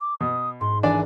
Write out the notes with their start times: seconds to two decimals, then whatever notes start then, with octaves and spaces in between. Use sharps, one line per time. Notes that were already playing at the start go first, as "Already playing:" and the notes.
0.01 D6
0.21 B2 D#6
0.61 G#2 C6
0.83 G#1 E3 D4 D5 G#5